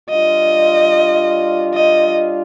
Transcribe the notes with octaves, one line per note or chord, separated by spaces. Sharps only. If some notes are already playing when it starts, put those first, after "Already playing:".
G3 D4 F4 D#5
D#5